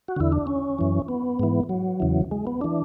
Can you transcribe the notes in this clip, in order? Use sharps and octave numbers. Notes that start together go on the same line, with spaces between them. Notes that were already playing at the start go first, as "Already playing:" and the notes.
F#4
E2 D3 E4
D4
C#4
F#2 E3
B3
G#2 E3
F#3
E2 C#3 E3
G#3
B3
E3 D4